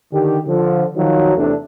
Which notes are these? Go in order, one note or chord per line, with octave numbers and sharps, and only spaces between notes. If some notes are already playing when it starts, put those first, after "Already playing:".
D3 D#3 G4
D3 F3
D#3 F3 F#3
E2 C3 A3 D4